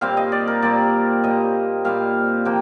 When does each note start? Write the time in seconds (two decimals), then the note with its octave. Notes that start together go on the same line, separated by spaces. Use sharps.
0.01 A#2 G3 C4 F5
0.17 D#5
0.32 D5
0.47 A#4
0.62 A#2 G3 C4 D5
1.24 A#2 G3 C4 D#5
1.85 A#2 G3 C4 F5
2.45 C3 F3 A#3 G5